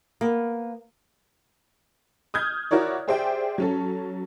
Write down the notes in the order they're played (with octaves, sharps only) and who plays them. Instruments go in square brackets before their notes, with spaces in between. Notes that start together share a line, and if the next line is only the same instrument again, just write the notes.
[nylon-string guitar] A#3 B3
[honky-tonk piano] D#6 F6 G6 G#6
E4 F#4 A#4 C#5 D5
G4 G#4 C5 D5 E5 G5
F#3 C#4 A4